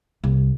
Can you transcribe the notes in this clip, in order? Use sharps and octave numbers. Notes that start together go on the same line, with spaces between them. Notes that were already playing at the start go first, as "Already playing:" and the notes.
C2